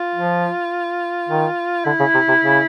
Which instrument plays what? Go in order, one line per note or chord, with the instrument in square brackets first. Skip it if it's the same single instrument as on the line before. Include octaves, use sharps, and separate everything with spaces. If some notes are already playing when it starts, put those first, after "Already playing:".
Already playing: [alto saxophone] F4
[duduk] F3
D#3
[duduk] D3 [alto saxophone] E4
[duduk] C#3
C3
C3
C#3